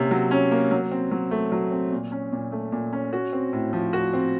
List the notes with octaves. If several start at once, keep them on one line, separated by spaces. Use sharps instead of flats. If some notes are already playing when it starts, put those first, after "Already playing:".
Already playing: C3 A#3 C#4
F#3
C#4
A#3
F#3
C4
F#3
A3
F#3
C4
A#2
C#4
A#2
A3
A#2
C#4
F#4
C4
A2
F3
F#4
C4